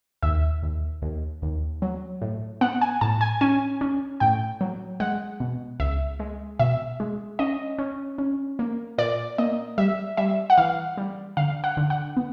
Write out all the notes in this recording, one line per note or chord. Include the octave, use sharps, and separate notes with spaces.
D#2 E5
D#2
D#2
D#2
F#3
A2
B3 F#5
G#5
A2 A5
G#5
C#4 G#5
C#4
A2 G5
F#3
G#3 F#5
B2
C#2 E5
G#3
B2 E5
G#3
C#4 D#5
C#4
C#4
A#3
A#2 D5
A#3 D#5
G3 E5
G3 E5
F#5
E3 F5
G3
D3 F5
F#5
D3
F#5
B3